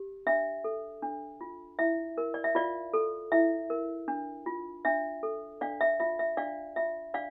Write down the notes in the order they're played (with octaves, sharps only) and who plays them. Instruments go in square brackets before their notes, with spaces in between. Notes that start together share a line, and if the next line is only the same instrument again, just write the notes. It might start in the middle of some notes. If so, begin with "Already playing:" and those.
Already playing: [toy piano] G4
D4 E5
A4
D4
F4
E4 E5
A#4
D5
E5
F4 D5 F5
A4
E4 E5
A#4
D4
F4
D4 E5
A4
D4 D5 F5
E5
F4 E5
E5
D4 D5 F5
F4 E5
D4 D5 F5